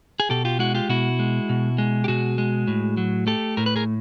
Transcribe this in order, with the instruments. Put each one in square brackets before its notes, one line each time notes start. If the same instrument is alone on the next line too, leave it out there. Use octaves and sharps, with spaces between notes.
[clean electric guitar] G#4
B2 G4 A4
F4 G4
G#3 E4 F#4
F4 G4
B2 E4 F#4
G#3
B2
G#3
G4
B2 F#4 G#4
G#3
A2
F#3
A3 G4 A4
A2 A#4
B4
G#4 A#4